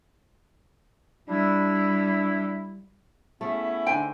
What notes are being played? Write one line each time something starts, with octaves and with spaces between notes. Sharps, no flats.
G3 D4 E4
A3 B3 C#4 E4 G#4
D3 D#4 C5 G5 G#5